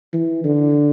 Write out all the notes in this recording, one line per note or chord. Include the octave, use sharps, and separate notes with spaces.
E3
D3